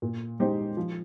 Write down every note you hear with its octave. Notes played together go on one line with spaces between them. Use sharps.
A#2
G#3 D#4 G4 C5
F3